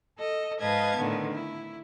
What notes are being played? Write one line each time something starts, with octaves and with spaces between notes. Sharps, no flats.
A4 D#5
G#2 B4 D#5 F5 A5 G#6
A2 D3 D#3 B3
E4